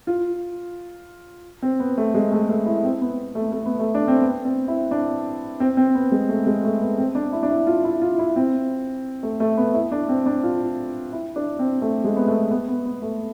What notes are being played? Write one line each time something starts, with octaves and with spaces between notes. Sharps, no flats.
F4
C4
B3
A3
G#3
A3
A3
E4
C4
B3
A3
A3
B3
A3
D4
C4
B3
C4
E4
D4
C4
C4
B3
G#3
A3
G#3
A3
B3
C4
D4
E4
D4
E4
F4
E4
F4
E4
C4
A3
A3
B3
E4
D4
C4
D4
F4
E4
D4
C4
A3
G#3
B3
A3
B3
B3
B3
A3